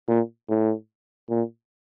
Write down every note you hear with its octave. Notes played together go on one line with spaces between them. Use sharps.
A#2
A2
A#2